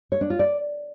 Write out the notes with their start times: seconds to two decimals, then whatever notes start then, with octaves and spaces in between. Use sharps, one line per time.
0.12 C#5
0.21 D4
0.30 F4
0.39 D5